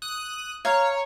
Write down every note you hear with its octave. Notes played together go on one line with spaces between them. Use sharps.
D#6 F#6
C#5 F5 A#5